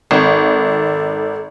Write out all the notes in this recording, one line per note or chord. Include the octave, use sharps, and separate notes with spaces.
G#1 A4